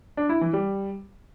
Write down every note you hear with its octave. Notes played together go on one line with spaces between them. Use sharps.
D4
E4
E3
G3